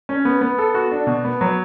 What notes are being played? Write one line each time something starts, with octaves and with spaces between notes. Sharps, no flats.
C#4
B3
B3
A4
F#4
D4
B2
B3
F#3